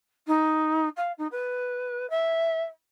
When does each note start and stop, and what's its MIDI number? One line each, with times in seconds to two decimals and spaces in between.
0.27 0.88 63
0.97 1.12 77
1.18 1.27 63
1.31 2.09 71
2.10 2.62 76